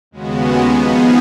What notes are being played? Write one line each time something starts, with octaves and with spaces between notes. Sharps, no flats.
D#2 C#3 G#3 B3 F#4
F3 B3 D#4 G#4